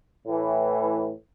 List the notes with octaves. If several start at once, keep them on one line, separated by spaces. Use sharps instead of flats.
A2 E3